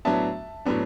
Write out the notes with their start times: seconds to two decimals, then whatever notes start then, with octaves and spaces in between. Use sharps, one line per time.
0.05 A2 F#3 B3 D4 E5 A5
0.65 A2 F#3 B3 D4